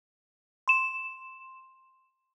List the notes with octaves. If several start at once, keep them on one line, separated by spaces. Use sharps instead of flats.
C6 E7